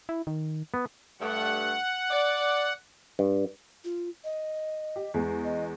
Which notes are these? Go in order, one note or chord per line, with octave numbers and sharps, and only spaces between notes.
E4
D#3
B3
G2 A3 F#5
D5
G2
F4
D#5
G4
E2 G#3
D#5